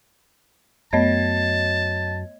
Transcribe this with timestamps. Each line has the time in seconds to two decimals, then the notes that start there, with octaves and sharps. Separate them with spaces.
0.93 F#2 A3 B3 C#5 D#5 A5 G#6